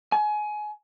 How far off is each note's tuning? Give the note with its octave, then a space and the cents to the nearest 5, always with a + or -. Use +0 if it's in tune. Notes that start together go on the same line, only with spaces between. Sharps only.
G#5 +25